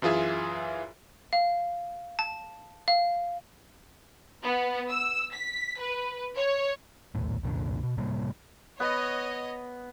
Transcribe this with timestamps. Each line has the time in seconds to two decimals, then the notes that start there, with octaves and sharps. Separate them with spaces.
0.02 F#2 E3 F4 G#4 E5
1.33 F5
2.19 A5
2.88 F5
4.42 B3
4.89 E6
5.32 B6
5.79 B4
6.37 C#5
7.15 A#1 D#2 A2
7.43 C2 F2 A#2 D3
7.83 B2
7.97 A2 C3 G3 A#3
8.80 B3 C#5 D#5